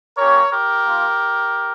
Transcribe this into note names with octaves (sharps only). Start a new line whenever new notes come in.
A#3 C#4 G4 A#4 C#5
G4 A#4
A#3 F4